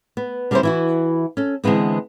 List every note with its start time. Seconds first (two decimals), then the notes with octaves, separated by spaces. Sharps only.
0.17 B3
0.51 D3 G3 C4 C#4 E4 C5
0.63 E3 E4 F#4
1.37 C#4 A4
1.64 D3 E3 G#3 B3 C4